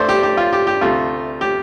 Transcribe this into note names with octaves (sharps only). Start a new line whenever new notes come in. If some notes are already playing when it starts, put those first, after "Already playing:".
Already playing: G2 A3 C5 D5
G4
G4
F4
G4
G4
D2 C3 A3 F4
G4